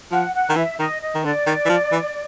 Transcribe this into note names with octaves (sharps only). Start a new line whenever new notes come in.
F3 F#5
F#5
D#3
E3 E5
D#3 D#5
D#5
D#3
D3 D5
D#3
E3
F3
E3